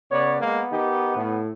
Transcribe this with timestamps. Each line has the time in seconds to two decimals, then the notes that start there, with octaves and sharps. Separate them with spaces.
0.11 C#3 B3 C#5 D5
0.41 G#3 A#3 B3
0.72 D#3 D#4 G4
1.15 A2